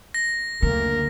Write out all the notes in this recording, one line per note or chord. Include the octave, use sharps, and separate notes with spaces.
A#6
F#1 D2 D3 A#3 A#4